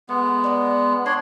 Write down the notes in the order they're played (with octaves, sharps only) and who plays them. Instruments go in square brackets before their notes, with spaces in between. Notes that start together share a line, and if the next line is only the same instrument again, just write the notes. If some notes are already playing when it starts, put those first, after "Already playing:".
[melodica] G#3 B3 [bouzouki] A3
[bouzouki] D5 D#5
[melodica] D4 C#5 C6 [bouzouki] F#4